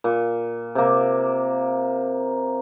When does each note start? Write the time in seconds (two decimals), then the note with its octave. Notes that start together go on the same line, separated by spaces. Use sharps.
0.04 A#2
0.75 C3 A#3